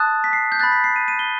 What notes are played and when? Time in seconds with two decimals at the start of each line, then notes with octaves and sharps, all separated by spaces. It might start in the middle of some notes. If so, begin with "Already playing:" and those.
Already playing: A5 D#6 F#6 A6
0.24 B6
0.33 C7
0.52 G6
0.59 B5 F#6 A6
0.72 B6
0.84 C7
0.96 D#7
1.08 D#7
1.19 G7